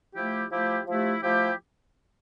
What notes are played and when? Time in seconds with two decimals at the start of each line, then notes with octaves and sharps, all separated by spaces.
0.14 F3 A3 E4 G4
0.51 F3 A3 E4 G4
0.87 F3 A3 E4 G4
1.22 F3 A3 E4 G4